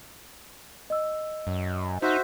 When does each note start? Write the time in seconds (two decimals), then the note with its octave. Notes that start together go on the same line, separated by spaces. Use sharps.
0.90 D#5 E6
1.47 F#2
2.02 D#4 F#4 C5 E5